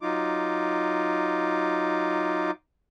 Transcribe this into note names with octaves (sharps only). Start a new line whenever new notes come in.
F#3 D#4 F4 D6